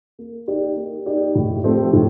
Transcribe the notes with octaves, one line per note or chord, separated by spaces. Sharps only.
A#3
D#4 G4 D5
A#3
D#4 G4 D5
A2
F3 A3 C4 G4
A2